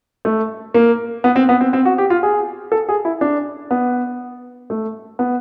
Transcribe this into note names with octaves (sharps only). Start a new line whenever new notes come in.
A3
A#3
B3
C4
B3
C4
C4
F#4
G4
F4
G#4
A4
G#4
E4
D4
B3
A3
B3